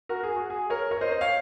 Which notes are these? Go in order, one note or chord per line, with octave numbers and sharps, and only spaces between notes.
F#4 A#4
G#4
F#4
G#4
A#4 C#5
A#4 C#5
C5 D#5
C5 D#5
C#5 F5